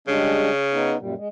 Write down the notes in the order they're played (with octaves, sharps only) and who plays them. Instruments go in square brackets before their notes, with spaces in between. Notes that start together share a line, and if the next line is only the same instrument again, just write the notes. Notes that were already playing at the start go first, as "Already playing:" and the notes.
[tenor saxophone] C#3 [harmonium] G3 G#3 D4
[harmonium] B3 D#4
F#2 A#2 G3
G#3